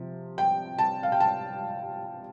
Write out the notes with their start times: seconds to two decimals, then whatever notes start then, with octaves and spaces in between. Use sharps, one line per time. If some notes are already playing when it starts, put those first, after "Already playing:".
Already playing: C3 F3
0.38 G5
0.79 A5
1.03 F5
1.12 G5
1.20 A5